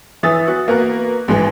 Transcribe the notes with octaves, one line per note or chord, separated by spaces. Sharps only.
E3 E5 D#6 A6
B3 F#4
A#3 B3 F#4 A#4
A1 G#2 E3